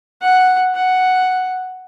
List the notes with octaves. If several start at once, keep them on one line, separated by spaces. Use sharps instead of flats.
F#5
F#5